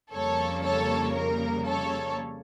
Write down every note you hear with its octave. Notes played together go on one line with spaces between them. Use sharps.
F2 C#3 G3 A#3 A4 C#5
A4 C#5
A#4
A4 C#5